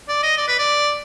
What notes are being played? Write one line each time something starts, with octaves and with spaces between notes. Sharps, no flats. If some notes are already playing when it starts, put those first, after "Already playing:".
D5
D#5
D5
B4
D5